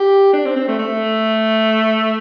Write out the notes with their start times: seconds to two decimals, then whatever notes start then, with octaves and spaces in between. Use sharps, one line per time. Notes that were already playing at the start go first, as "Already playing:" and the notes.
Already playing: G4
0.33 D4
0.45 C4
0.56 C4
0.68 A3
0.78 A3